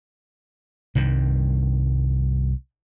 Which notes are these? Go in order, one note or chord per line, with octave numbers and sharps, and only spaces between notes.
C2 G2 D#3